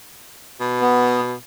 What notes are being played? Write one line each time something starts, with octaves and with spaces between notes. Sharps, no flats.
B2
B3